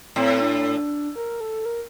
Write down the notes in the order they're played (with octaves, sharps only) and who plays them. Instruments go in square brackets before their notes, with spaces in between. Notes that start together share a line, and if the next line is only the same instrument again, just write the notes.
[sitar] A2 [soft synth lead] C4
[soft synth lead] D4
A#4
A4
A#4